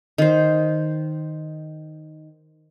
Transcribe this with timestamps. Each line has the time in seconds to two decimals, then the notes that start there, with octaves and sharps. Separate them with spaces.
0.18 D#3 C5